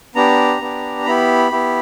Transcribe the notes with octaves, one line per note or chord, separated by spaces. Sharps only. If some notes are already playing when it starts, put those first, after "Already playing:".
B3 D4 G4 A#5
B3 D4 G4
B3 E4 G4 B5
B3 E4 G4